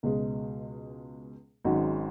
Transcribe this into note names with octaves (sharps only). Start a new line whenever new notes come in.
C#2 B2 G#3
G#1 G#2 F#3 C#4 F#4